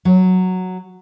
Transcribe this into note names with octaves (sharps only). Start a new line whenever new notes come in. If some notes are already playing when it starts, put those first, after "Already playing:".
F#3